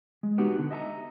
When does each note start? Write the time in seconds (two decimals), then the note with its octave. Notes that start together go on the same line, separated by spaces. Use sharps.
0.23 G#3
0.38 B3 D#4 F#4 G4 B4
0.58 D3
0.71 D#5 E5 A5 A#5